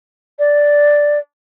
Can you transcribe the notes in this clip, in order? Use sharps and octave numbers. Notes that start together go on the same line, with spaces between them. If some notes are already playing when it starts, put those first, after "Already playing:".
D5